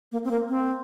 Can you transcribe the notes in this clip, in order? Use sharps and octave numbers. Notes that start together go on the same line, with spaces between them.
A#3
C4
A#3
C4